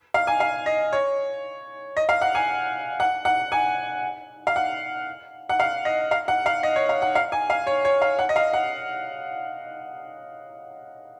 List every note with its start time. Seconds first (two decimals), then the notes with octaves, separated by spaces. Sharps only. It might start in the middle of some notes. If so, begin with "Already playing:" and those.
0.14 F5
0.27 G#5
0.40 F5
0.66 D#5
0.93 C#5
1.97 D#5
2.09 F5
2.22 F#5
2.35 G#5
3.00 F#5
3.25 F#5
3.52 G#5
4.47 F5
4.56 F#5
5.49 F#5
5.60 F5
5.85 D#5
6.11 F5
6.28 F#5
6.46 F5
6.63 D#5
6.76 C#5
6.89 F5
7.02 F#5
7.15 F5
7.32 G#5
7.50 F5
7.67 C#5
7.85 C#5
8.02 F5
8.19 F#5
8.29 D#5
8.36 F5
8.53 F#5